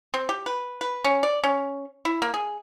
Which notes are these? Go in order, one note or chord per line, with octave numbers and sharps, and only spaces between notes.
C4
G4
B4
B4
C#4
D5
C#4
E4
A#3
G#4